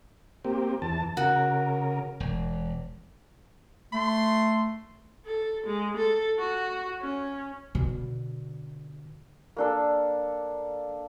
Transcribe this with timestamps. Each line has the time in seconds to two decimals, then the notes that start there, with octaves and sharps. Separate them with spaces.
0.45 A#3 C4 G4
0.82 E2 A5
1.17 C#3 F#4 A#4
2.20 E1
3.93 A3 C6
5.26 A4
5.66 G#3
5.97 A4
6.39 F#4
7.01 C#4
7.75 B2 D3
9.57 A#3 D4 A4